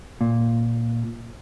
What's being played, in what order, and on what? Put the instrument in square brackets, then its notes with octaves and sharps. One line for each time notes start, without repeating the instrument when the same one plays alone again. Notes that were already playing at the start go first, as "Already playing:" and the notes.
[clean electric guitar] A#2